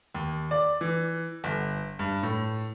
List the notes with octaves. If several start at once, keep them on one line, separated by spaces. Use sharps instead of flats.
D#2
D5
E3
G1
G2
A2